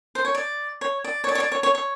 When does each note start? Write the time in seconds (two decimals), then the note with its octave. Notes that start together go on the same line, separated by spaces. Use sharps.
0.15 C5
0.25 C#5
0.35 D5
0.81 C#5
1.04 D5
1.24 C#5
1.28 D5
1.35 C#5
1.40 D5
1.52 C#5
1.63 C#5
1.75 C#5